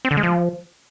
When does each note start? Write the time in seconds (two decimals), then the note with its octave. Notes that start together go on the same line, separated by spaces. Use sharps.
0.05 C4
0.11 D3
0.17 G#3
0.23 F3